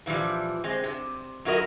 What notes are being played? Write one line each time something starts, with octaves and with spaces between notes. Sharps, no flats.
A#2 E3 F3 G3
G#3 C4
C3
F#2 E4 F#4 A#4 D#5